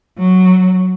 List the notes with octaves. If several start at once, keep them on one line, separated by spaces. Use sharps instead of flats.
F#3